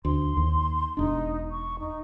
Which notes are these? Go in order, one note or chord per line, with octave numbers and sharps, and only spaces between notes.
D2 C6
D#2
E1 D4 D#4
C#6
D#4